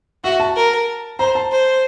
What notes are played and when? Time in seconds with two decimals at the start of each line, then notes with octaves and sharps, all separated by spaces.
0.24 F#4 E5
0.40 A5
0.56 A#4
1.19 C5 A#5
1.35 A5
1.51 C5